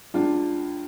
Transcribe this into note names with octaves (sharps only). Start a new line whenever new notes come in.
C#2 D4 F4